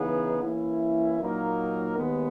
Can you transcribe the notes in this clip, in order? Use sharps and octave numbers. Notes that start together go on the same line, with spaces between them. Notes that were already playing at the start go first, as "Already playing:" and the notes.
Already playing: C#3 E3 B3 D#4 G#4
E3 A#3 C#4 E4
A#2 F#3 A#3 D#4 A#4
D#2 D#3 G#3 B3